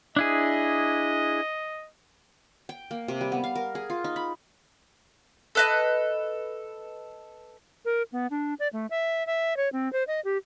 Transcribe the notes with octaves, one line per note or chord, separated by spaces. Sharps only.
D4 E4 G#4 D#5
G5
A#3
C3
G3
B3
F5
A#4
G#4
F4
D#4
B5
A4 B4 D#5
A#4
B3
D4
D5
A3
E5
E5
C#5
C4
C5
D#5
G4